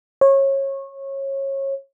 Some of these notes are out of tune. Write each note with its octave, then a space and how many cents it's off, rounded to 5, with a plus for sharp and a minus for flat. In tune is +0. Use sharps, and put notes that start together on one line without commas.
C#5 -25